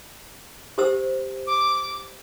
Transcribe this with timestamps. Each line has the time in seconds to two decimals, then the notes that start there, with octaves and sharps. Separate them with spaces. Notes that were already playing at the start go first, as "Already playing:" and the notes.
0.78 G4 C5 E6
1.47 D6